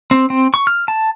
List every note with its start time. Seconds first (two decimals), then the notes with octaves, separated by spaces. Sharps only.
0.11 C4
0.30 C4
0.54 C#6
0.67 F6
0.88 A5